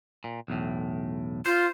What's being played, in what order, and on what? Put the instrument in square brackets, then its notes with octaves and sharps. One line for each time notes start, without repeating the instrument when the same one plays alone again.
[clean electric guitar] A#2
B1 E2 A2
[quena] F4 [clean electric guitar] C5